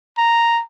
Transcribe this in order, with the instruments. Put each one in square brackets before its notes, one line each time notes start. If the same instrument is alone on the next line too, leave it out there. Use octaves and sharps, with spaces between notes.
[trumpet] A#5